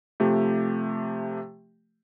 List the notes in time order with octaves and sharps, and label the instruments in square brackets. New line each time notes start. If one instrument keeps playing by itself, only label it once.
[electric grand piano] C3 F3 A3 G4